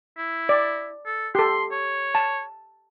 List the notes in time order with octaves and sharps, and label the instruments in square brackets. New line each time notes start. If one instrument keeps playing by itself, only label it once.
[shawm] E4
[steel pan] D5
[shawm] A4
[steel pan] G4 A4 [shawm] C6
[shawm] C#5
[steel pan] A5